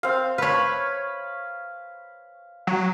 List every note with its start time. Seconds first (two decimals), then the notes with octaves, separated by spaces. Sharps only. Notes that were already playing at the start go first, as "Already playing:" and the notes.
0.03 C4 F5
0.38 B4 C#5 F5 B5
2.67 F#3